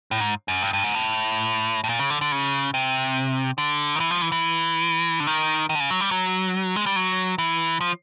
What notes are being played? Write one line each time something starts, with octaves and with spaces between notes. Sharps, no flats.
A2
G#2
F#2
G2
G2
G#2
A2
A2
A#2
C#3
D3
D3
C#3
C3
D3
D#3
E3
F3
E3
E3
D3
D#3
D#3
D3
C#3
F#3
G3
F#3
G#3
G3
F#3
E3
F3